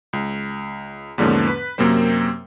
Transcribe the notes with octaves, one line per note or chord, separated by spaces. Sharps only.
C#2
E2 G#2 D3 F3 A#3 C#4
B4
F#2 C3 A#3 C4 C5